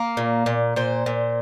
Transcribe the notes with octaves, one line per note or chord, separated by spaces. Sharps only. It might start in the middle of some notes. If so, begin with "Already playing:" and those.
Already playing: A#3
A#2
A#2
A#2 C5
A#2